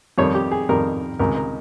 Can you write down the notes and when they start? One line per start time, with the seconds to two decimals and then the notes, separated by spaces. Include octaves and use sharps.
0.18 F2 D#3 G3 C#5
0.35 G4
0.52 G#4
0.69 F2 D#3 G3 A#4
1.19 C#2 C3 D#3 G#3 A#4
1.36 A#4